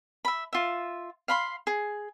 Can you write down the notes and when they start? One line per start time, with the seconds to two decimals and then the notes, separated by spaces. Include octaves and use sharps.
0.25 E5 B5
0.53 F4 E5
1.28 F5 B5 C6
1.67 G#4